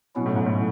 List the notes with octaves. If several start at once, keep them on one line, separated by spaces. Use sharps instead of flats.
B2 F#3 C#4 E4
A2
G#2
A2